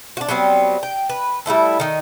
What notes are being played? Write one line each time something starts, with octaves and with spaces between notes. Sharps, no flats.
D4 F#4
F#3 G3 B3 C4
G5
B4
G3 A3 E4 A4
D#3 D#4